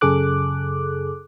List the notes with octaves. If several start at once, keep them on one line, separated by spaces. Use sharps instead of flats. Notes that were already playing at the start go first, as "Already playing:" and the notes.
F#2 C#3 G#4 A4 D6 F#6